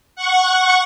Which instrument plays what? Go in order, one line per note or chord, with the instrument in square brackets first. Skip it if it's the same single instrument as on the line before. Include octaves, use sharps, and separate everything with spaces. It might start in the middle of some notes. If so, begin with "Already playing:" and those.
[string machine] F#5 C#6